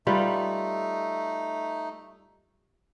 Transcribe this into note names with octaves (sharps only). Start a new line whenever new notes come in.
G3 A3 D#4 F4 B4